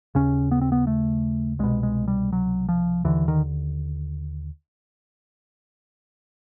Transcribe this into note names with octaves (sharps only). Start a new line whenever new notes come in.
D#2 C#3 C#4
B3
C4
B3
A3
C2 B2 G#3
G#3
G3
F#3
F3
D#2 D3 E3
D#3